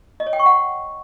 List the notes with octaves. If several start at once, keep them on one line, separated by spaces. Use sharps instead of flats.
D#5
C#5
G5
C#6
F#5